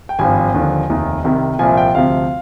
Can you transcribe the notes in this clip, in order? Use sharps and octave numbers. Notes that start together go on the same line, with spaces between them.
G5
G#1 G2 F3 G#5
D#2 D3 F3
F1 D#2 D#3
C2 C3 D#3
C2 A#2 F3 G#5
G5
D2 C3 F3 F5